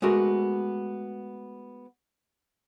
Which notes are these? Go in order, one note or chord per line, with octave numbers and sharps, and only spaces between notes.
G#3 A3 B3 D4 F#4 A#4